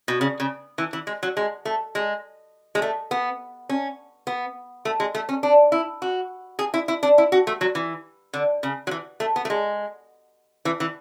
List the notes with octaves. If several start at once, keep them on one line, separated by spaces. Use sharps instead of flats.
B2
C#3
C#3
E3
E3
G#3
F#3
G#3
A3
G#3
G#3
A3
B3
C#4
B3
A3
G#3
A3
C#4
D4
E4
F#4
G#4
E4
E4
D4
E4
F#4
A3
F#3
E3
D3
C#3
F#3
E3
A3
B3
A3
G#3
E3
E3